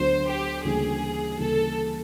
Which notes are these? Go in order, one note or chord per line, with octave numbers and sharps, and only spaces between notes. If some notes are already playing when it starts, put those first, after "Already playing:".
Already playing: D2 D3 F#3 B3 C5
G4
D2 C#3 E3 G3 A#3 G#4
D2 C#3 E3 G3 A#3 A4